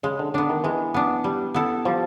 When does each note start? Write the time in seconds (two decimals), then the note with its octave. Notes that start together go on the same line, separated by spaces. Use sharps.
0.03 C#3 G#3
0.19 D3
0.34 D3 B3 D4
0.49 D#3
0.64 E3 G#3
0.94 B3 D4
1.24 G3
1.54 B3 E4 A4
1.85 F3 G3